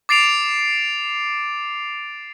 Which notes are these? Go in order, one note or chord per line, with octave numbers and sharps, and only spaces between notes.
D6 A6 C7 D7 F7